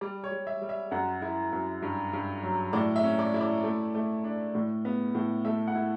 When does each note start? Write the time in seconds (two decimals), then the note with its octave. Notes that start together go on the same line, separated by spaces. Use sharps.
0.01 G3 D5
0.24 C#5
0.32 G3
0.47 E5
0.61 G3
0.69 E5
0.91 F#2 F#5
1.22 E4
1.53 F#2
1.82 G2
2.13 G2
2.43 F#3
2.73 A2 D5
2.96 E5
3.03 C#4
3.19 D5
3.34 E4
3.41 D5
3.64 A3
3.95 A3
4.24 D4
4.55 A2
4.85 B3
5.15 A2
5.45 A3 E5
5.68 F#5
5.75 E4